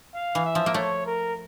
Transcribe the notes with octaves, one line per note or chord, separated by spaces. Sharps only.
F5
E3
E5
F3
A#3
A3 C#5
A#4